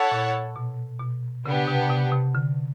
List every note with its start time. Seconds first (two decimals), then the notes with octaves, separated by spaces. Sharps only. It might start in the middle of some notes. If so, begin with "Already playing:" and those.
Already playing: E4 A4 C#5 F#5 A5
0.11 A#2
0.56 B2
1.00 B2
1.46 C#3 B3 D4 G4
1.68 C3
1.90 C3
2.12 C3
2.35 D3